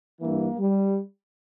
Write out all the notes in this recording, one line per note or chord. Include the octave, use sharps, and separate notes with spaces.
G2 E3 A#3
G3